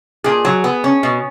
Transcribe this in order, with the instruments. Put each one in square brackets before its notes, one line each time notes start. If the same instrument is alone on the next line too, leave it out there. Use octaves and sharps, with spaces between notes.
[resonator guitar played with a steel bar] A#2 G#4
F#3
B3
C#4
B2